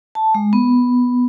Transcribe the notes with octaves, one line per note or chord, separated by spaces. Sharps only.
A5
G#3
B3